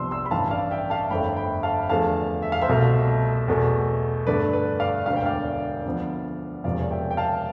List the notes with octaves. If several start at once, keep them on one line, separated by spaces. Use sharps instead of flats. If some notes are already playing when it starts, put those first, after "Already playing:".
Already playing: C2 C3 F3 B3 D4 C6 E6
C6 E6
B5
A1 G2 E3 F5 A5
D5 F5
E5 G5
F5 A5
G1 F2 D3 A3 G5 B5
G5 B5
F5 A5
E2 D3 F3 A3 F5 A5
E5
F5
C5 E5
C2 B2 A3
E2 B2 A3
G2 D3 A3 B4 D5
B4
D5 F5
E1 D2 D3 F5
G5
D5 F5
D2 D3 F3 B3
E1 E2 C3 F3 D5 F5
E5 G5
G5
F5 A5